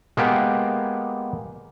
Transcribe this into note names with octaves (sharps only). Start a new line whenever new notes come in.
G#3 A#3 B3 G4